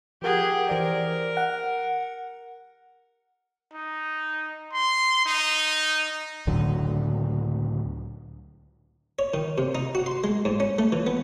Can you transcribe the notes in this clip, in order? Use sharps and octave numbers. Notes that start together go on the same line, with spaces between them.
F3 G4 G#4 A#4 F#5
E3 A#4 C5 D5
F#5
D#4
C6
D#4
C#2 A2 D3 F#3
C#5
D#3
C3
D#4
F#4
C6
G#3
G#2
C#4
A3
E3
B3